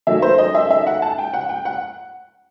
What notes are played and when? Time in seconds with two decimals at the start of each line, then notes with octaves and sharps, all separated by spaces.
0.07 D#3 F#3 A3 E5
0.22 C5
0.38 D#5
0.55 E5
0.70 E5
0.87 F#5
1.02 A5
1.18 G5
1.33 F#5
1.49 G5
1.65 F#5